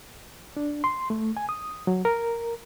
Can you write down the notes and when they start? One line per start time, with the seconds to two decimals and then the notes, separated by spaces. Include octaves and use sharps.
0.57 D4
0.84 C6
1.10 A3
1.37 G#5
1.49 D#6
1.87 F#3
2.05 A#4